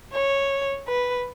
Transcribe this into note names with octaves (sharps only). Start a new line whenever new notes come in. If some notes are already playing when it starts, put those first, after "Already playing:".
C#5
B4